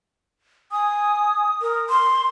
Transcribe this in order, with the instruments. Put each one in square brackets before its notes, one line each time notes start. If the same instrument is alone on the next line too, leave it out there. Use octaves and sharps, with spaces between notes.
[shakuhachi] G#5 [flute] D#6
[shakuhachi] A#4
C6